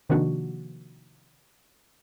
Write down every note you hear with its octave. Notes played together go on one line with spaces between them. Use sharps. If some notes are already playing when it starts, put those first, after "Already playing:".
C3 D#3 F3 A#3 D4 F#4